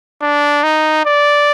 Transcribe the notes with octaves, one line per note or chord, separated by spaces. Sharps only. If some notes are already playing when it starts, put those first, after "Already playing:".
D4
D#4
D5